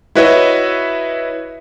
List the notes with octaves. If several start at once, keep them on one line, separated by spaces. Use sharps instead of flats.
E4 F#4 B4 C#5 D#5 E5